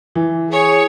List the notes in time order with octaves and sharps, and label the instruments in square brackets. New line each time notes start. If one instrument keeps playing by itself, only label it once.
[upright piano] E3
[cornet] G#4 [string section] C#5